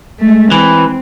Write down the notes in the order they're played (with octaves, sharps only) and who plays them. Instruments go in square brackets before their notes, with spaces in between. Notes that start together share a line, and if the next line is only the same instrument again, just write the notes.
[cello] G#3 A3
[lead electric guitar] E3 [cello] C4